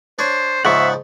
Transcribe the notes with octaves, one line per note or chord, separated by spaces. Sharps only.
D4 C5 C#5
G#2 C#3 F3 E5 F#5 C#6